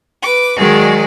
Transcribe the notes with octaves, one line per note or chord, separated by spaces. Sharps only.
B4 D6
D#3 F#3 G#3 G#4 D5